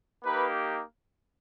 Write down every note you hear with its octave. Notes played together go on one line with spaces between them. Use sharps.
A#3 D#4 G4 B4